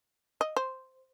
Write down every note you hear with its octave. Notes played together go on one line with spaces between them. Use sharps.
D#5
C5